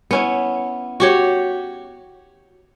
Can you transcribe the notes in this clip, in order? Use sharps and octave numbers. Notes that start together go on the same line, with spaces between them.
B3 C#4 E4
F#4 G4 C#5